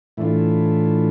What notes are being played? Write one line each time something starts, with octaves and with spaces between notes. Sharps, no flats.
A2 E3 A3 D4 F4